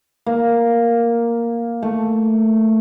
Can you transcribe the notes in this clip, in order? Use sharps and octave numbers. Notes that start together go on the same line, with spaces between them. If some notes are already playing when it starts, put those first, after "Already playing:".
A#3
A3